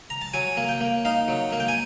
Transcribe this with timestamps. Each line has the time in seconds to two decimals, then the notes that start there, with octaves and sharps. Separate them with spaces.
0.10 A#5
0.22 A5
0.34 F#3 G#5
0.57 A#3
0.69 G5
0.81 A#3
1.05 D#4 F5
1.28 F#3
1.53 A#3
1.60 G5
1.68 G#5